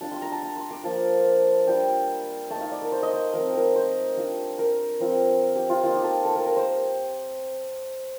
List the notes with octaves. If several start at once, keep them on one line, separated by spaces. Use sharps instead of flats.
G3 D4 F4 A5
C6
A#5
A5
A#5
C6
D6
F3 A#3 F4 A5
G3 D4 F4 G5
A3 D#4 A5
F5
D5
A#4
C5
D#5
C5
F3 A3 C4 A#4
A#4
C5
G3 D4 F4
A#4
F3 C4 F4
G4
F4
A#3 D#4 F4
G4
A4
A4
A#4
A#4
C5